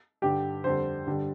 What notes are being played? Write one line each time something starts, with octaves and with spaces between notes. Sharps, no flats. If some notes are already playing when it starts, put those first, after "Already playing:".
G2 D3 G3 G4
F2 D3 G3 C5
G2 D3 G3